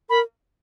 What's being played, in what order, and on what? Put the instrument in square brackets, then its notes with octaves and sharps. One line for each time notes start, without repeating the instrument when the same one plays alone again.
[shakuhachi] A#4 [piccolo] B5